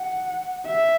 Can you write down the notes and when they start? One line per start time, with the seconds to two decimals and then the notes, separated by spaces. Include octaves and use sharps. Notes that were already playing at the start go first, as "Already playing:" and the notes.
Already playing: F#5
0.66 E5